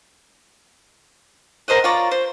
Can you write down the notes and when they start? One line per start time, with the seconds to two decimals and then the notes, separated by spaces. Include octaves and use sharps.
1.68 A#4 C5 D#5 F#5
1.84 F4 C#5 D5 A#5
2.11 C5